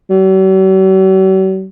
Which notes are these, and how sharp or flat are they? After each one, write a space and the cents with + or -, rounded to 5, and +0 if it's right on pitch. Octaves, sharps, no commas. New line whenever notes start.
F#3 +45